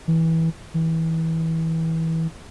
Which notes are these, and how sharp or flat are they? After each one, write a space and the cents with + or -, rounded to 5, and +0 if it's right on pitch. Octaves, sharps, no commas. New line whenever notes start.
E3 -20
E3 -25